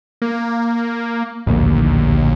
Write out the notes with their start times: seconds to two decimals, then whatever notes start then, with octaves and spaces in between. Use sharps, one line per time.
0.22 A#3
1.46 D1 A#1 D#2 A#3